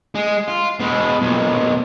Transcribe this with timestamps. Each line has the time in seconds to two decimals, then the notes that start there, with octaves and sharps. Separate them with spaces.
0.15 G#3
0.48 F4
0.80 B2 G#3
1.22 B1 A#2